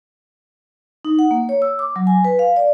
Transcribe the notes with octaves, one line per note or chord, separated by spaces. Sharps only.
D#4
F#5
A#3
C#5
E6
D6
F#3
G#5
B4
F5
D5